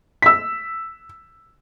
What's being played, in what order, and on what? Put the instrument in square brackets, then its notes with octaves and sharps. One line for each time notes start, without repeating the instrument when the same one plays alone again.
[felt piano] E6 B6